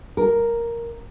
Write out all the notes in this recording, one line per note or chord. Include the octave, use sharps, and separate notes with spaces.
A#4